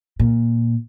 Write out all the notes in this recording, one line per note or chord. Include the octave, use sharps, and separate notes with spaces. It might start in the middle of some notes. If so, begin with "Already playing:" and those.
A#2